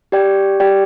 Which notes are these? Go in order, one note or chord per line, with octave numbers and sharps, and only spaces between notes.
G4 D5 G5
G4 D5 G5